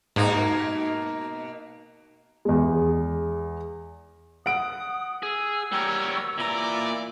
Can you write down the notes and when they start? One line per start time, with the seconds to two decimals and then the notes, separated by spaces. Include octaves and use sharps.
0.16 G#2 B2 A#3 D#4
2.45 E2 G#3
4.46 F#5 D#6 D7
5.23 G#4 E6
5.72 G3 G4 A#4 C#5
6.38 A#2 E3 D5 A#5